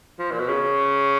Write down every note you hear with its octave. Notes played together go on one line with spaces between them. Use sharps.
F3
A#2
B2
C#3